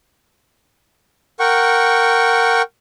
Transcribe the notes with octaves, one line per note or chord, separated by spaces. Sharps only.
A#4 F#5 G5 C#6